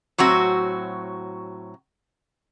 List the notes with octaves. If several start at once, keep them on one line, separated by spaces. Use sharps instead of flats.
A2 F#3 C4 F#4